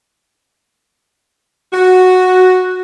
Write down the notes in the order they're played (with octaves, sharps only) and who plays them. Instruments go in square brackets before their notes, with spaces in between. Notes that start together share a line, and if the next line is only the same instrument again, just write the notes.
[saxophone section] F#4